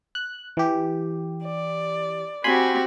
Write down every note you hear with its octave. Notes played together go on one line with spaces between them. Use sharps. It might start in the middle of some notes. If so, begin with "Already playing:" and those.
F#6
E3 G4
D5
C4 F#4 G4 G#5 B5 C6